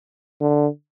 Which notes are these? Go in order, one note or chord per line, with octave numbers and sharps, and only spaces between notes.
D3